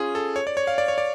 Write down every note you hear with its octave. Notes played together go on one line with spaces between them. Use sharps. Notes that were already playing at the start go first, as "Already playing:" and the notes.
Already playing: C#4 F4 G#4
A4
C#5
D5
C#5
F5
D5
C#5
D5